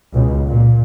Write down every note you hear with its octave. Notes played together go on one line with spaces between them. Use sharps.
C#2 B2
A#2